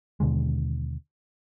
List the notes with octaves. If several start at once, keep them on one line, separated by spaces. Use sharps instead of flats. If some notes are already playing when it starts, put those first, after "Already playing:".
D#2 B2 D3 G#3